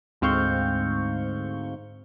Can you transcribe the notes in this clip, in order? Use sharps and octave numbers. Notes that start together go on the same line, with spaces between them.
D2 G#2 C4 F5 C#6 G6